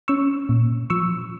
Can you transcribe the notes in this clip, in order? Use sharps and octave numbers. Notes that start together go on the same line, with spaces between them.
C#4 C#6 E6
A#2
F3 C#6 E6